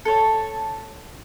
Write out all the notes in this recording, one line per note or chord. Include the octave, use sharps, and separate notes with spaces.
A4 C#5